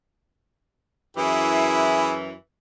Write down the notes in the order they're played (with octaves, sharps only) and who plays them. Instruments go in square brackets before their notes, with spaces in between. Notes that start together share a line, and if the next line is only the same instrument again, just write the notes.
[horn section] F#2 E3 [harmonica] E4 G#4